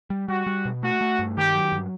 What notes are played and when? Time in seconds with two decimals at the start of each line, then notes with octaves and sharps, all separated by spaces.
0.10 G3
0.28 G3 F#4
0.47 G3
0.65 B2
0.83 A3 F#4
1.01 A3
1.19 G2
1.37 D#3 G4
1.54 F#3
1.72 G2